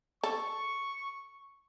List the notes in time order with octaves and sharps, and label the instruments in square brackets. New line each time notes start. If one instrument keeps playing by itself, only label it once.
[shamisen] A4 [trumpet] C#6